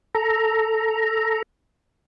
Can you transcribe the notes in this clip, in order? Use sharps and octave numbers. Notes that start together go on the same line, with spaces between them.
A4 A#5